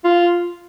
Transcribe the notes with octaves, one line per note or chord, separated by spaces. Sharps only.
F4